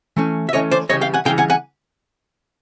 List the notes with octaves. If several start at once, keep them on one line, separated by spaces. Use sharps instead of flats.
E3 A3 C#4
E5
E3 A3 C#4 C#5 D#5
C5 D5
C#3 E3 G3 C#5 D#5
F5 G5
F#5 G#5
C#3 E3 G3 F5 G5
F#5 G#5
F#5 G#5